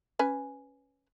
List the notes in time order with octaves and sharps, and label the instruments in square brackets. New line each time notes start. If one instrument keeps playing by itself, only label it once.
[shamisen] C#4 B4 G#5